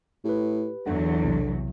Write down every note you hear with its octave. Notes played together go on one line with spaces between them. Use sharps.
A2 G4 B4
E2 D3 F#3 F#5
B1 C3